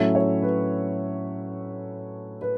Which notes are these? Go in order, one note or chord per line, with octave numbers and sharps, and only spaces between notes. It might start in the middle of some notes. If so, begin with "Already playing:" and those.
Already playing: A2 F#3 A3 C#4 E5
C#5
B4
B4